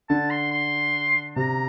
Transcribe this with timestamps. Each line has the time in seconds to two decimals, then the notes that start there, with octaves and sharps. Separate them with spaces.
0.09 D3 A5
0.30 C6
0.51 C6
1.36 C3 A#5